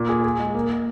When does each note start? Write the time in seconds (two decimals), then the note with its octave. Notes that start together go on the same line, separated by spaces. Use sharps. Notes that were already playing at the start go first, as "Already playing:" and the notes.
Already playing: A#2
0.09 G#4
0.23 G#4
0.40 G#3
0.55 A#3
0.70 A#3